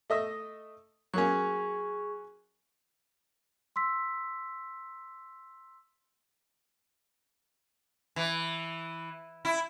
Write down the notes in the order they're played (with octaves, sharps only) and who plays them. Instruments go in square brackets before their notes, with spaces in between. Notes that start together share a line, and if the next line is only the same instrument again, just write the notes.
[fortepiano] A3 D#5 E5
[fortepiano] F#3 A#3 C#4 [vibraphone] G#4 C#6
[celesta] C6 E6 B6
[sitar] E3
E4